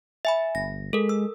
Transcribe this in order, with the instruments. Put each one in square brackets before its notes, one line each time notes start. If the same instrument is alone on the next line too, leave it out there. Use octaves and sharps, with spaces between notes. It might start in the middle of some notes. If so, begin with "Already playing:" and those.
[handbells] E5 G#5 B5
[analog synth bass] G1 [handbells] A#6
[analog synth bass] G#3 [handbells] A4 A#4
[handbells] E6